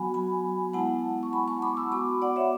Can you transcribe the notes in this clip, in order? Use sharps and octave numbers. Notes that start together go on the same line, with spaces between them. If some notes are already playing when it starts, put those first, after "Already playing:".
Already playing: F#3 B3 F#4 G#5 B5
G#5 B5
G#3 B3 E4 F#5 A5
C#6
G#5 B5
A5 C#6
B5 D6
C#6 E6
B3 F#4 B5 D6
D5 F#5
C#5 E5